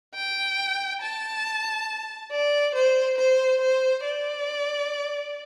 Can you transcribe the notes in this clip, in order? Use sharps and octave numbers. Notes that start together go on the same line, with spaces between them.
G5
A5
D5
C5
C5
C5
D5